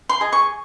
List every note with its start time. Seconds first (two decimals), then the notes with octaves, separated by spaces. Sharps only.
0.09 C6
0.21 G#4 D#5
0.33 C#6